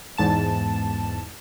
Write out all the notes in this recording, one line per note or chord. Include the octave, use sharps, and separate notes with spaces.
E2 G#2 A5 E7